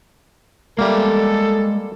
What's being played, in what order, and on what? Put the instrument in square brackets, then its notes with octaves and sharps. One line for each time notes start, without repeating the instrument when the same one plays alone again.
[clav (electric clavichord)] G3 A#3 [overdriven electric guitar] G#3 E5 [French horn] A4